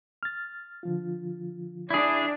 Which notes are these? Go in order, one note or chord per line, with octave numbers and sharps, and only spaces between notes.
F6 A6
D3 F3 F4
D4 E4 G#4